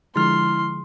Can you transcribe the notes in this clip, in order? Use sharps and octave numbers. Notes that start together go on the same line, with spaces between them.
D3 F3 G#3 E4 C6 F6